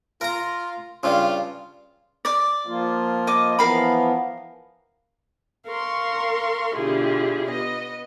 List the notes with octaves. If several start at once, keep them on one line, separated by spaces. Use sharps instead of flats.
F4 A#4 A#5
G2 C#3 F4
D5 D6
F3 A#3 F4
D#5 D6
E3 F3 B3 A#4 F5 B5
A#4 F5 C6 C#6
B2 D3 E4 F4 G4 G#4
B3 D#5